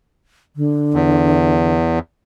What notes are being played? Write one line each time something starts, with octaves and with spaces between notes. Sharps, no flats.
D3
E2